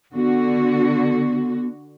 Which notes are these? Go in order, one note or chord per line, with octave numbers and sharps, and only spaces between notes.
D3 B3 F#4